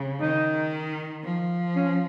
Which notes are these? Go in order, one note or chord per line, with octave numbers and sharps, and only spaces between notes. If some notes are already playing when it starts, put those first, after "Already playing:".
Already playing: C#3
D#3 D#4
F3
C#4